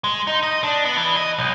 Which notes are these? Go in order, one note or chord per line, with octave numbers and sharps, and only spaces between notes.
G#3
D#4
D#5
D4
B3
E3
D#5
B1